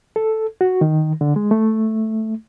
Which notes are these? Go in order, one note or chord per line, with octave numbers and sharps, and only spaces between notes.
A4
F#4
D#3
D3
G#3
A3